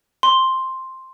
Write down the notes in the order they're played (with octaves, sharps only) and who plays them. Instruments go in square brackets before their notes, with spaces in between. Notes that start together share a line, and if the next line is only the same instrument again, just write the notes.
[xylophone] C6